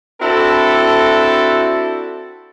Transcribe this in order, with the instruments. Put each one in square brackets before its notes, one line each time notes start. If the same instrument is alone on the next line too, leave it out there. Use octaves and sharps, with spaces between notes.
[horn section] C4 D4 E4 F#4 A4